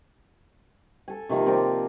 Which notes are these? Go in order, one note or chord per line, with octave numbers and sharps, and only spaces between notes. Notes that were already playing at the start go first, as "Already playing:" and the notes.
A4 G#5
C3 D#3 F3 A#3
C4 A#4 D5